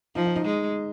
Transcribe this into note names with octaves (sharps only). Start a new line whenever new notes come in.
F3 D#4
D#4
D#4
G#3